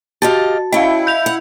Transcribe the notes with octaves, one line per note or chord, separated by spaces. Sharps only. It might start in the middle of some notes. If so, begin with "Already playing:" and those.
F#4 G4 D#5 F5 A5 A6
C#4 E4 D#5 F5 G5
G6 F7
F#5